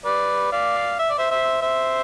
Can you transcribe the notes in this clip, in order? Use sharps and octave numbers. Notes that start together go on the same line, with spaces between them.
B4 D5
D5 F5
E5
D5
C5 E5
C5 E5
C5 E5